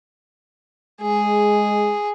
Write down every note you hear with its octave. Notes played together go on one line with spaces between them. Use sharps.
G#3 G#4